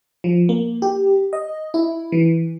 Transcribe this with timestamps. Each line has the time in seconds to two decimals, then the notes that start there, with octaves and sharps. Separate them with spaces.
0.24 F3
0.49 A#3
0.82 G4
1.33 D#5
1.74 E4
2.12 E3